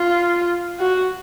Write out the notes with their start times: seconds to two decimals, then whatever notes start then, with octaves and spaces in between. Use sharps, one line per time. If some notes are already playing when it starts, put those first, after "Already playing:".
Already playing: F4
0.80 F#4